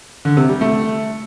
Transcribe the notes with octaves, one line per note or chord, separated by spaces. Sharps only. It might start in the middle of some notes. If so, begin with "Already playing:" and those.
D3
C3
G3
A3